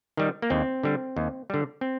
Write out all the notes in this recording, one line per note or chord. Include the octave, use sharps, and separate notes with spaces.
D#3 G3
A#3
D#2 C4
D3 G3
D#2
D3 G3
C4